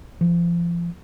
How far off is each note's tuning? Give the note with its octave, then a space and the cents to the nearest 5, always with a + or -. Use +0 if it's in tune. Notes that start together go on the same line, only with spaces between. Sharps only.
F3 -30